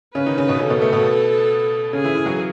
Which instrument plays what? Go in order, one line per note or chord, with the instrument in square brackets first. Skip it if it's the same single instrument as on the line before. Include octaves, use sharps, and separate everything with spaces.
[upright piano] C#3 C#4 [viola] B4
[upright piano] D#3 D#4
C#3 C#4
B2 B3
[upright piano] C#3 C#4 [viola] A4
[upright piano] B2 B3
A3
B2 B3
[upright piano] C#3 C#4 [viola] G#4
[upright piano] E3 E4
E3 E4
F#3 F#4